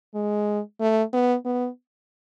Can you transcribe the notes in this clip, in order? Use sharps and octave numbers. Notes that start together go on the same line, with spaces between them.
G#3
A3
B3
B3